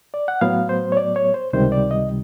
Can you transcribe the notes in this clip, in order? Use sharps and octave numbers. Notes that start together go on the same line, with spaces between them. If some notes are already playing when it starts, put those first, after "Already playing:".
D5
F#5
A2 F#3 B3 F5
C5
C#5
D5
C#5
C5
C#2 C3 D#3 G3 C5
D5
D#5